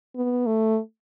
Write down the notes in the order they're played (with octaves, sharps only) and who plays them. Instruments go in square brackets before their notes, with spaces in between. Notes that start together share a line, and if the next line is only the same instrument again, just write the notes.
[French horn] B3
A3